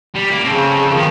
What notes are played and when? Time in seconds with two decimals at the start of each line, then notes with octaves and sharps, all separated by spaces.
0.15 G3
0.31 A#3
0.44 C#3 C4 A4
0.93 D#3 F3 B3